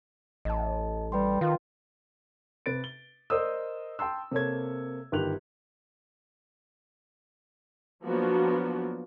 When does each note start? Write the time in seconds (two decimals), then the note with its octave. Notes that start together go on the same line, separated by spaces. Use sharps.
0.45 A1 D#5 A5
1.12 G3 B4 G5 C6
1.41 D#3 F4
2.66 C3 B4 A6 D7
2.84 G7
3.30 A#4 C5 D5 D#5 D#6 E6
3.99 G5 A5 C6 E6
4.32 C3 A#3 A4 C#5 G#6
5.12 G1 D#3 G4 F#6 F7
8.06 F3 F#3 A#3 B3 D4 F#4